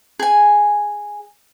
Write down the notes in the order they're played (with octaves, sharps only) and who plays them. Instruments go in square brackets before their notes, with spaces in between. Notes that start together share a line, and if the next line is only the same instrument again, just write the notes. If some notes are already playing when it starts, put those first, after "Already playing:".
[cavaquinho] G#4 G#5